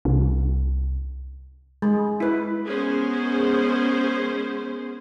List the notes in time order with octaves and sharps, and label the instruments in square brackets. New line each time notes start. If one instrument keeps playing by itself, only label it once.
[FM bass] C2
[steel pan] G#3
E4 B4
[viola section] G#3 B3 C#4 G#4 A#4 C5